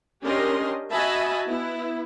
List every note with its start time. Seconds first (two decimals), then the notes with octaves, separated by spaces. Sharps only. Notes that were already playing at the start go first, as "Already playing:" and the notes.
0.22 C#4 D4 G4 A#4 D#5 C6
0.92 F#4 D#5 E5 G#5 A5 B5
1.47 B3 E4